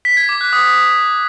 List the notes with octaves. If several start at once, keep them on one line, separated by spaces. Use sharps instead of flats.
B6
G#6
D6
F#6
D#6